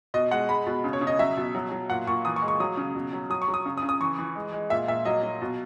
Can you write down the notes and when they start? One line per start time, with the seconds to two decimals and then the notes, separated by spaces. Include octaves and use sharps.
0.14 B2 D#5
0.31 G#3 F#5
0.49 G#3 B5
0.66 B2
0.84 C#3
0.93 C#5
1.01 C#3
1.07 D#5
1.19 F#3 E5
1.37 B2
1.55 F#3
1.72 F#3
1.90 A#2 F#5
2.07 A#2 C#6
2.25 E3 D#6
2.36 C#6
2.42 G#3
2.48 C#6
2.60 F#3 D#6
2.77 C#3
2.95 B2
3.13 F#3
3.30 F#3 D#6
3.42 C#6
3.48 F#3
3.54 D#6
3.66 C#3
3.77 D#6
3.83 C#3
3.89 D#6
4.01 E3 C#6
4.18 E3
4.35 G#3
4.53 G#3
4.70 A#2 E5
4.88 A#2 E5
5.05 F#3 D#5
5.23 F#3
5.42 B2